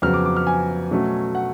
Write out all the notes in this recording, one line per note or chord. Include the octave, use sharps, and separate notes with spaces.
F2 C#3 F#3 B3 F6
D6
D6
F6
G#5
B2 F#3 A3 C#4
F#5